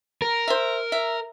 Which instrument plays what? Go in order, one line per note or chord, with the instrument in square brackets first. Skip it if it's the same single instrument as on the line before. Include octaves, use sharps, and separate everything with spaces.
[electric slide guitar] A#4
[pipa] C5 E5
E5